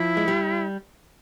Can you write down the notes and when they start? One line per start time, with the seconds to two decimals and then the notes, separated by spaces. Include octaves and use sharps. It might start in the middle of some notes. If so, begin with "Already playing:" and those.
Already playing: F3 E4
0.17 G#3
0.28 G3